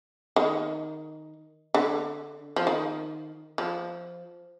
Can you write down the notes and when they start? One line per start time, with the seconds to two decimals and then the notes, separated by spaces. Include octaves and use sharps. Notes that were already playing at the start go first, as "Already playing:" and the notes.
0.36 D#3
1.74 D3
2.56 F3
2.67 D#3
3.58 F3